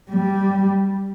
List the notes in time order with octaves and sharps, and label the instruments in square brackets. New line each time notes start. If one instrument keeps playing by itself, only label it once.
[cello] G3